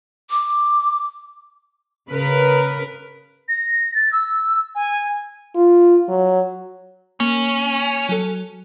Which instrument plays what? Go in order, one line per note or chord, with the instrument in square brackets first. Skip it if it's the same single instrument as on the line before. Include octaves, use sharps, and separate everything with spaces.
[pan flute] D6
[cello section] C#3 A#4 B4
[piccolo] A#6
A6
E6
G#5
[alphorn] F4
F#3
[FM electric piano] A#3 [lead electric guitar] C#4
[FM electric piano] F#3 A4